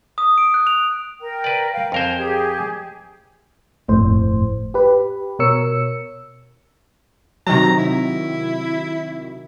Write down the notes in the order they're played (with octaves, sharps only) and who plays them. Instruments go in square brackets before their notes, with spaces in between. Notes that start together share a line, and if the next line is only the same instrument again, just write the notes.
[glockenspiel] D#6
D7
F#6
F7
[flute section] A#4 G5
[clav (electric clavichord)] B4 D5
[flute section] F5 G5
[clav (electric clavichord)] F2 A#4 C5 [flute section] G#5
[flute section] G4 G#4
[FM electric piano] G1 F2 A2 C5
G4 B4
B2 A#4 C#5 E6 C#7
[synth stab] C3 D#3 F#3 [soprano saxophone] A#5
[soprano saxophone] E4